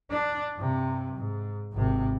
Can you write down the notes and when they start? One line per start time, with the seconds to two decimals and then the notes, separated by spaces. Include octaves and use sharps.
0.11 D4
0.57 G2 C3
1.15 G#2
1.73 G#1 C3